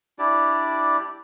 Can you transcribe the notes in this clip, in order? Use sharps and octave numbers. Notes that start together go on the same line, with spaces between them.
D4 E4 G4 D5